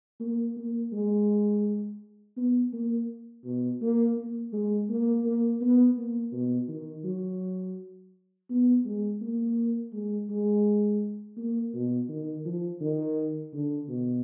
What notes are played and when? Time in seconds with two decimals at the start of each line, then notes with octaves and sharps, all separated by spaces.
0.20 A#3
0.57 A#3
0.93 G#3
2.37 B3
2.73 A#3
3.44 B2
3.81 A#3
4.17 A#3
4.53 G#3
4.89 A#3
5.25 A#3
5.61 B3
5.97 A#3
6.32 B2
6.68 D#3
7.04 F#3
8.50 B3
8.85 G#3
9.21 A#3
9.93 G#3
10.29 G#3
11.37 A#3
11.74 B2
12.09 D#3
12.45 F3
12.81 D#3
13.53 D3
13.89 B2